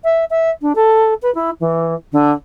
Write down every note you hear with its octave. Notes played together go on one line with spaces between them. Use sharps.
E5
E5
D4
A4
B4
E4
E3
D3